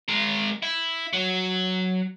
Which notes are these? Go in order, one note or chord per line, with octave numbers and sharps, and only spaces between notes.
G#3 A#4
E4
F#3